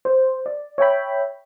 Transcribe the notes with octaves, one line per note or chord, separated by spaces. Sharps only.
C5
D5
C#5 E5 G5 B5